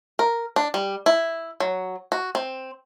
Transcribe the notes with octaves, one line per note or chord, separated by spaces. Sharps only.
A#4
D4
G3
E4
F#3
F#4
C4